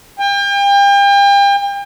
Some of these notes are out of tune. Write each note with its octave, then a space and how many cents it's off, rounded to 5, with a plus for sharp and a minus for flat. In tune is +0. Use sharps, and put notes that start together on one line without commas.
G5 +35